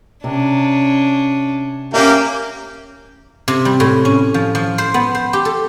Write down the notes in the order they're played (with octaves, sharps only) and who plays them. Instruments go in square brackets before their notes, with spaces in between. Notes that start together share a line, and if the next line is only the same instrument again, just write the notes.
[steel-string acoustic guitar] C3 [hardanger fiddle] C#4 D4
[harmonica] A#3 G4 [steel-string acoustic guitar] C#4 C#5 E5
[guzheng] C3
G3
A2
C#4
F3
F3
C5
B3
C5
G4
A4